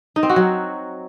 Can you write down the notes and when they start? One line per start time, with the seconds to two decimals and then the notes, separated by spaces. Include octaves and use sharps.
0.16 D#4
0.23 C4
0.30 F#4
0.36 F#3